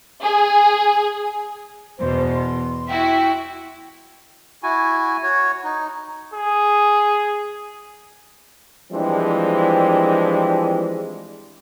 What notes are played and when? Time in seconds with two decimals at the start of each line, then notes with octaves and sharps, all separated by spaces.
0.22 G#4
1.98 E2 B2 C5
2.35 C6
2.89 E4 F#4 E5 G5
4.63 E4 F#4 G#5
5.23 F#4 C#5
5.64 D#4
6.34 G#4
8.91 E3 F3 G3 G#3 C4 D4